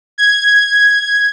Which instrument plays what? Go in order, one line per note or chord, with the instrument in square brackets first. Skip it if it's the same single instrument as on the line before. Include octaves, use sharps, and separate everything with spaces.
[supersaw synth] G#6